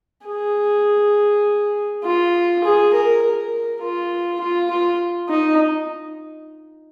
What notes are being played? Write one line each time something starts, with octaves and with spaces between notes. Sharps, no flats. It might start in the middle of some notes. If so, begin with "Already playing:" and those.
G#4
F4
G#4
A#4
A#4
F4
F4
F4
D#4